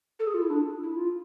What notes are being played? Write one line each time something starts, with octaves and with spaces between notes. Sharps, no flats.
A4
G#4
F4
E4
D4
E4
F4